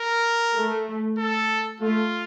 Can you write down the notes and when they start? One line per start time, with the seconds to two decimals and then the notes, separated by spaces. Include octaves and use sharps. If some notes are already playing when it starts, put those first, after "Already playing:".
Already playing: A#4
0.54 A3
1.18 A4
1.80 A3 F4